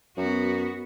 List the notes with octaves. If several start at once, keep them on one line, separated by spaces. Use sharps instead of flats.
F#2 B3 F#4